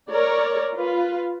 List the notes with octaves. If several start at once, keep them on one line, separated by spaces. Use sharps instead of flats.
A#4 C#5 D5
F4 B4